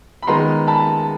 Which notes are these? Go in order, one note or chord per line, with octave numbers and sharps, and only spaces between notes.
B5
D#3 G#3 B3 A#5 C6
A5 B5